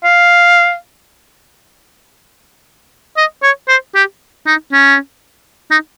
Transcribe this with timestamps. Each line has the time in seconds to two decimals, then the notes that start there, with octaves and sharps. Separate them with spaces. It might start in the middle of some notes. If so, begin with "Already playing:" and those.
0.04 F5
3.17 D#5
3.43 C#5
3.68 C5
3.95 G4
4.47 D#4
4.73 C#4
5.71 D#4